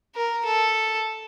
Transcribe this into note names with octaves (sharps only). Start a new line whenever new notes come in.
A#4
A4